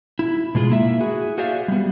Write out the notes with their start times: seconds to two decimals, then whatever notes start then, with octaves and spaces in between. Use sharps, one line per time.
0.19 E4
0.55 B2 G#3 F4 G#4
0.70 A#3 E4 E5
1.01 F#4 G#4
1.38 F#4 G#4 C5 D5 E5 F5
1.68 G3 B3